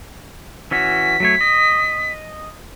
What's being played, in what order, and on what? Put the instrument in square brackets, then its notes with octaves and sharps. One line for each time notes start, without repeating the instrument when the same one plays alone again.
[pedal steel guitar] E3 C#4 F#4 [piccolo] B6
[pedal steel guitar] F#3 A3 C#5
D#5